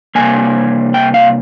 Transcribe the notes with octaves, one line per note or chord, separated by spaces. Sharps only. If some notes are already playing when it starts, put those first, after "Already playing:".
C3 G3 A#3 G#5
G5
F5